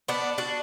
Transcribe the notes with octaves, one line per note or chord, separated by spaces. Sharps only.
B3 D4
D4 F#4